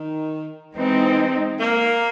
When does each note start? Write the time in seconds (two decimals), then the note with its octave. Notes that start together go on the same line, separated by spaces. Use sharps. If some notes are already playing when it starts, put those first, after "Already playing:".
Already playing: D#3
0.76 E3 G#3 C4 D#4
1.60 A#3